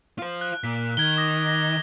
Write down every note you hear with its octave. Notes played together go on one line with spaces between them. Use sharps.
F4 C5
F#6
A#2 B6
D#3 G#6 G7
D6 D#6 A#6
A#6